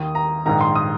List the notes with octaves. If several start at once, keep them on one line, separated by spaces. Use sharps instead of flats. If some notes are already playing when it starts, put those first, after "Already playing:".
Already playing: D#2 D#3 D#6
A#5
A#1 G#2 D#3 A#5
C6
D#6